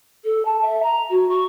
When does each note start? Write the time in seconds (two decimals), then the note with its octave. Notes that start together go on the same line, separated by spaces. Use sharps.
0.24 A4
0.45 A5
0.61 E5
0.82 A#5
1.10 F#4
1.29 C#6